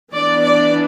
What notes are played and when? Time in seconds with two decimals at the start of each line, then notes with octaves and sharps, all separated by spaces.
0.12 E3 B3 D4 D5
0.42 D5